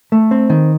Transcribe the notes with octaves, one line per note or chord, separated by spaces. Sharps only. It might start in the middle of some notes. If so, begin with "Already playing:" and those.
A3
C4
D#3